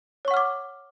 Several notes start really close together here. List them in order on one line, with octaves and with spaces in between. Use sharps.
C#5 C#6 F#5 F6 D6